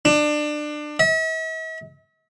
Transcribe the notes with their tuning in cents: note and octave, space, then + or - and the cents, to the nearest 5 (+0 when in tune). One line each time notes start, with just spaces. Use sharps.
D4 +25
E5 -45